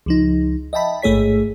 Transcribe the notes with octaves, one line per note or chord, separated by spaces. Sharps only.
C#2 F3 D#4
D#5 E5 G5 A5 B5
A1 G#2 A3 G#4 C#5 B6